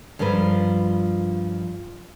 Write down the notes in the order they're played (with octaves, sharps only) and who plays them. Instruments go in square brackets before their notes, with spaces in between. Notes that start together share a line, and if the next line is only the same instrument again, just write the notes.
[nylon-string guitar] G2 F3 F4 A#4 B4